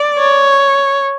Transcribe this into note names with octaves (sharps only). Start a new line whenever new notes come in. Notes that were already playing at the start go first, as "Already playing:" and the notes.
Already playing: D5
C#5